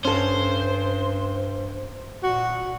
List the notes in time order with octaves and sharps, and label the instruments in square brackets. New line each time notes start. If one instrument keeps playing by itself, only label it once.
[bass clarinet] G2 [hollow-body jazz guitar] C#4 A4 [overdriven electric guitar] C5
[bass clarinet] A#2 [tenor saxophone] F#4